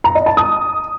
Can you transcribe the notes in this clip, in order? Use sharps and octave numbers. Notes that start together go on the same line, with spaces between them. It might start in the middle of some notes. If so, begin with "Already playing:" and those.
A#5
D#5
A5
D#6